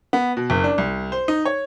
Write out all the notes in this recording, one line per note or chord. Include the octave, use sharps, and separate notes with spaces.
B3
B2
F#1
D4
C2
C5
D#4
C#5